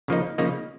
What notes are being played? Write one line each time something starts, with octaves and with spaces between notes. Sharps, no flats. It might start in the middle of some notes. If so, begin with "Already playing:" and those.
C#3 F3 A#3 D#4
C#3 F3 A#3 D#4